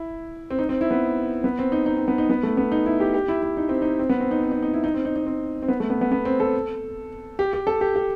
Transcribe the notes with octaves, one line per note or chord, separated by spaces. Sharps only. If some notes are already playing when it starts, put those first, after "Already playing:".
Already playing: E4
C4
D#4
C4
E4
B3
B3
C4
D#4
D#4
C4
B3
D#4
B3
A3
B3
D#4
E4
G4
G4
E4
E4
D#4
C4
D#4
C4
B3
C4
D#4
C4
D#4
D#4
E4
D#4
C4
D#4
D#4
C4
C4
B3
A3
B3
B3
B3
C4
A4
G4
G4
A4
G4
G4